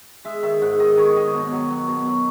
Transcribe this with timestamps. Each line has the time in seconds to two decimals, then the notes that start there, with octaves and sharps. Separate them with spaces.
0.25 G#3 E5
0.43 D#3 E5
0.62 G#2 F#5
0.80 D#3 D#5
0.97 D#3 C#5
1.16 D#3 D#5
1.34 B2
1.52 F#3
1.70 F#3
1.88 B2
2.06 F#3